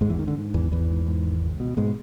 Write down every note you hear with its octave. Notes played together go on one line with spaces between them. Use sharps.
G#1 G#2 G#3
E2 E3
G#2 D#3
D3
G#2
G#1 E2 E3
G#1 E2 E3
G#2
G#2
G#1
C#2
B2
G#2 B2 G#3